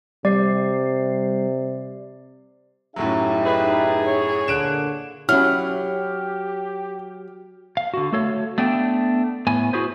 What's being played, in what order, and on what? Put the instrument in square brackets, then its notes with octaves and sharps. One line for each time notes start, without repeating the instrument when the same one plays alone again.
[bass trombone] C3 [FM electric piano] G3 C7 [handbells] D5
[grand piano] F#2 A2 F#3 [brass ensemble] D#4 G4 E5
[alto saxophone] G#4 [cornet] B4
[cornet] C#5
[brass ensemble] A#2 D3 [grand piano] F#6 D7 E7
[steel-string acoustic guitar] F#3 [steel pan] C#4 E4 [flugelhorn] G4 [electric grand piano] F6
[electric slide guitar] F5
D3 F#4
A3 F#4 A4 C#5 F5
A3 B3 D4 G5
A2 B3 G#5
E4 F#4 G#4 B4 C5